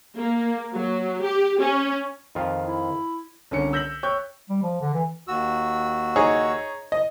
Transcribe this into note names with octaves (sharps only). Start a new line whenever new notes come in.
A#3
F#3
G4
C#4
F2 D#3 F4
E4
C2 D3 C#4 C#7
E6 G6 A#6 B6 F#7
C#5 G5 C#6 F#6 G6
G3
F3
D3
E3
D#2 F#4 E6
D#4 G#4 C#5
D#5